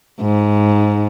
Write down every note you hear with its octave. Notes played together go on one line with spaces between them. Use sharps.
G#2